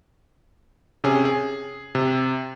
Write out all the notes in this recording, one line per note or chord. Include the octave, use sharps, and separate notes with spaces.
C3 C#4 G#4
G#4
C3